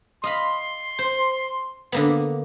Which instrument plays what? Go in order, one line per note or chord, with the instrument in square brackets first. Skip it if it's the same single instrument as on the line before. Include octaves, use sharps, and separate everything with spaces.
[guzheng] D#5 F5 B5 [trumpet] C6
[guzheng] C5
D3 A#3 B3